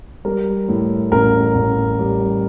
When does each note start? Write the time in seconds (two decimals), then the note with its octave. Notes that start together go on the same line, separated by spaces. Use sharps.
0.25 G3 A#4
0.69 A2
1.11 A1 A#4
1.55 A1
1.99 G3